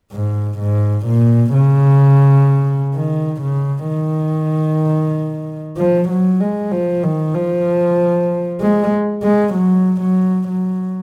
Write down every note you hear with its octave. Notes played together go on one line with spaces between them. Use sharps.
G#2
G#2
A#2
C#3
D#3
C#3
D#3
F3
F#3
G#3
F3
D#3
F3
G#3
G#3
F#3
F#3
F#3